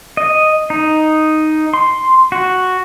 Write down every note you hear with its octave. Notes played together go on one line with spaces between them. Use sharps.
D#5
D#4
C6
F#4